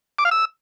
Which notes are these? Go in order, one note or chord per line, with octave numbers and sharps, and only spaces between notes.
D6
F5
E6